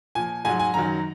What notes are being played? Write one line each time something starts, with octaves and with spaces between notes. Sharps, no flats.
A#2 F3 G#5
G#2 F#3 G#5
G#5
F#2 D#3 F#3 A#5